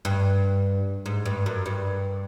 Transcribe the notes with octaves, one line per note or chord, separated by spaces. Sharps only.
G2
G#2
G2
F#2
G2